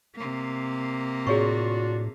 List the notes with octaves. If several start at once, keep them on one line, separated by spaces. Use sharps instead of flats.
C3 A#3
A2 D4 F4 F#4 G#4 C#5 C#6